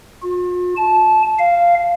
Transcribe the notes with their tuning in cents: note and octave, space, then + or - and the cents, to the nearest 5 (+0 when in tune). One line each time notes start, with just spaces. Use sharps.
F4 +45
A5 -20
F5 -10